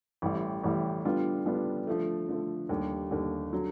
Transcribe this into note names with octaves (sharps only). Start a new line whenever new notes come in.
A1 A2 E3 G3
A1 A2 E3 G3
D3 G3 B3 D4 F4
D3 G3 B3 D4 F4
D3 F3 A3
D3 F3 A3
D#2 D3 G3
D#2 D3 G3
D3 F#3